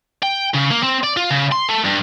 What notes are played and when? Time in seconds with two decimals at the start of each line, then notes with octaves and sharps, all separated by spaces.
0.23 G5
0.54 C#3
0.71 A#3
0.83 C4
1.03 D5
1.17 F4
1.30 C#3
1.52 C6
1.69 A3
1.85 G2